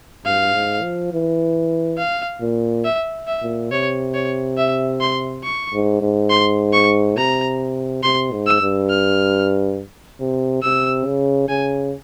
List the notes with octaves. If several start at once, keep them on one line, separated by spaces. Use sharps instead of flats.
G2 F5
G#2
F3
E3
F5
A#2
E5
E5
A#2
C3 C#5
C#5
E5
C6
C#6
G#2
G#2
C6
C#6
C3 A#5
C3 C6
G#2
E6
G2
F6
C3
C3 E6
C#3
C#3 G#5